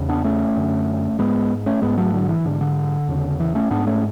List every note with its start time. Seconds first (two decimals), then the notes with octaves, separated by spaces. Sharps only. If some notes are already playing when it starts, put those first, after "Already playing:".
Already playing: E2 C#3
0.09 B3 D4
0.24 A3 C#4
0.56 F#2 D3
1.19 G#2 G#3 B3
1.66 A3 C#4
1.82 G#2 G#3 B3
1.98 F#3 A3
2.13 D3 F#3
2.29 E3
2.45 G#2 D3
2.61 D3
3.08 E2 C#3
3.40 E3
3.55 A3 C#4
3.71 G#2 B3 D4
3.87 A3 C#4